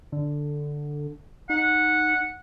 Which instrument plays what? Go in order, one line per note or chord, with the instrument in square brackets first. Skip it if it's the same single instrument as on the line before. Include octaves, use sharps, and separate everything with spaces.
[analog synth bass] D3
[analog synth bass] D#4 [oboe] F#5